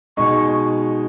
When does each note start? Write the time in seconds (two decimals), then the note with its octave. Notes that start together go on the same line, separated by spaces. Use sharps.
0.17 B2 G#3 D#4 C#6